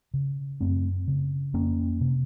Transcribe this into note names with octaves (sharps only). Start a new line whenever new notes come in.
C#3
F#2 A3 C4
C#3
F2 A#3 C#4
C3